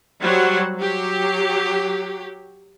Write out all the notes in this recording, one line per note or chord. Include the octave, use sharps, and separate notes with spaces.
F#3 G3 C5 F#5
F#3 G4